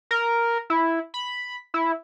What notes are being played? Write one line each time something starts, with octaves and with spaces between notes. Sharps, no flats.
A#4
E4
B5
E4